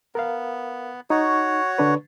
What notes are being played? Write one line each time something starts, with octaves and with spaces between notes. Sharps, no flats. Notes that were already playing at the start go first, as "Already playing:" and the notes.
B3 A#4 F5
D#4 F#4 C#5
D3 D4 B4